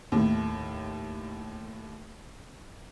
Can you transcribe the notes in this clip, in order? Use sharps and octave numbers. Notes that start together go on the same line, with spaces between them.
D#2 A2